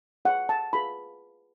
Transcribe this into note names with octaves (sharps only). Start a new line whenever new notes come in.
F4 G#4 C#5 F#5
A5
F4 G#4 B4 B5